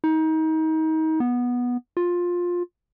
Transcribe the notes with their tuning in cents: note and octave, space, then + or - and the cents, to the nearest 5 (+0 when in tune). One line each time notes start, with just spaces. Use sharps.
D#4 +30
B3 -10
F4 +15